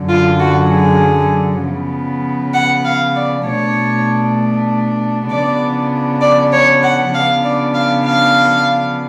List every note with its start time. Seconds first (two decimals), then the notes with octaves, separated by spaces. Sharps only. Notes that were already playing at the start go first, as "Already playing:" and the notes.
Already playing: F#2 D3 F#3
0.08 F4
0.39 F#4
0.70 G#4
1.62 C#3 F3 B3
2.54 F#5
2.84 F5
3.15 D5
3.45 B2 A3 D4 C#5
5.30 C#3 F3 B3 D4 D5
6.21 D5
6.52 C#5
6.82 F#5
7.13 C#3 F3 B3 D4 F5
7.44 D5
7.74 F5
8.05 F5